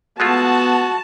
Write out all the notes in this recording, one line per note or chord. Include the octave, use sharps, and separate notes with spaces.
G#3 A3 B3 F4 F#4 A5